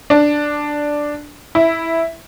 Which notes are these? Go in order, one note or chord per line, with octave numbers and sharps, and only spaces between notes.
D4
E4